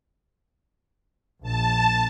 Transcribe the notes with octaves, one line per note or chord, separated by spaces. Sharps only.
A#1 A5